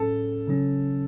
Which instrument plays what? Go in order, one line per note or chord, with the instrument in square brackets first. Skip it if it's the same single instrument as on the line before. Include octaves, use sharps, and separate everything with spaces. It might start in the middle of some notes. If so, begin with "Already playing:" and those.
Already playing: [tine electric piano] A2 F#3 C#4 G#4 [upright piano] A4
[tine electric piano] C#3 F#3 C#4